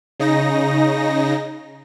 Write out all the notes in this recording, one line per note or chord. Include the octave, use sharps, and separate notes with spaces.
C#3 D#4 A#6